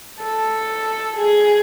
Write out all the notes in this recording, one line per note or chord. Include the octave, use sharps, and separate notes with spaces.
A4
G#4